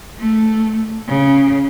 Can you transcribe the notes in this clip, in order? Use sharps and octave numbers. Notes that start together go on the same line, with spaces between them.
A3
C#3